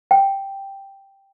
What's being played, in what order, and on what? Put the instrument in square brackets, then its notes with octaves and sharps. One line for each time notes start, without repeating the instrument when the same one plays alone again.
[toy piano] G5